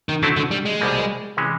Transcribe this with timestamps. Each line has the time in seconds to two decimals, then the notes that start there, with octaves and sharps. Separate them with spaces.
0.09 D#3
0.22 D3 F#3 A3 C4 E4
0.36 D3
0.51 G3
0.66 G#3
0.80 C2 B2 G3 A#3
1.37 C3 E3 G#3 C#4